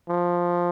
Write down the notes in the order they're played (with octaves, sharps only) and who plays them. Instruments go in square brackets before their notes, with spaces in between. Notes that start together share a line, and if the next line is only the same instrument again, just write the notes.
[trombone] F3